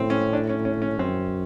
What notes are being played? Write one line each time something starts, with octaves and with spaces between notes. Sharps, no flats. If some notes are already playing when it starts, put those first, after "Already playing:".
Already playing: A2 C4
C#4
D4
C#4
C#4
C#4
F#2 C4